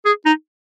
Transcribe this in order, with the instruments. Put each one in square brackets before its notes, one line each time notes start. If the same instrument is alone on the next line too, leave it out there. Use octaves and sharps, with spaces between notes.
[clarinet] G#4
D#4